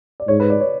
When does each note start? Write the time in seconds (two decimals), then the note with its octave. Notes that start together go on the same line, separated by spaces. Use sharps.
0.20 D5
0.28 G#2 C#5
0.40 B4
0.50 D5
0.61 C#5